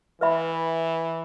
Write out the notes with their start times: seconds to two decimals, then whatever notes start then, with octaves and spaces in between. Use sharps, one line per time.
0.21 E3 B4 E5 B5